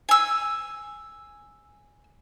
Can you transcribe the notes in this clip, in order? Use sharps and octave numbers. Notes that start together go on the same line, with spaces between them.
G#5 E6